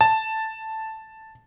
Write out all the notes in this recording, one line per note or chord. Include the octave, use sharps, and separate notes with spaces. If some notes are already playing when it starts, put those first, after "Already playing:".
A5